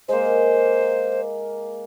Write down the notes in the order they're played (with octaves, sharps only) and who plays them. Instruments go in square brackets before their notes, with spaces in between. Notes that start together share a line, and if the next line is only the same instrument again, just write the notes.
[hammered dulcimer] G#3 A#3 [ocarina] C5